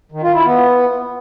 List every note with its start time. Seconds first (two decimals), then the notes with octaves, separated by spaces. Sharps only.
0.12 D#3
0.23 F4
0.34 E4
0.44 B3